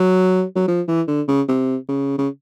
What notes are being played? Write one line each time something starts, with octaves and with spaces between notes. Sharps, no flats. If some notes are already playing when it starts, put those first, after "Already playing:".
Already playing: F#3
F#3
F3
E3
D3
C#3
C3
C#3
C#3